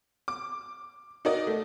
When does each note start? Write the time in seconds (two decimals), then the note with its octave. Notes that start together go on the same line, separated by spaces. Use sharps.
0.28 D6
1.25 D#4 F#4 A#4 D5 D#5
1.47 A3